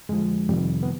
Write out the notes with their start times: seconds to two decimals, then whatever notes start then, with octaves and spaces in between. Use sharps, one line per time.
0.09 F2 D3 F3 G#3
0.49 F2 C3 D#3 G3
0.83 B3